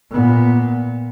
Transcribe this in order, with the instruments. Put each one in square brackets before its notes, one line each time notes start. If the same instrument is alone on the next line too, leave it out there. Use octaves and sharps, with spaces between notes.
[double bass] A#2 B3